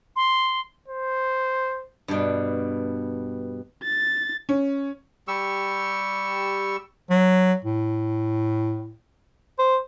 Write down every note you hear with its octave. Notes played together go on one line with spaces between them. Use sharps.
C6
C5
G2 B2
A6
C#4
G3 G4 C#6 E6
F#3
A2
C5